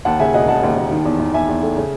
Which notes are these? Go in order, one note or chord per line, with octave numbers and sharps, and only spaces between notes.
D#2 F#5 A5
C#3 E5 G#5
E1 D#5 F#5
C#3 F#5 A5
D#2
D#2
D#3
E2
E2
E2 E5 G#5
E2
A3
C#3